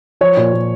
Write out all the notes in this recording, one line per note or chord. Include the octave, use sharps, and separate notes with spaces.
F3 C#5
A#2
A#2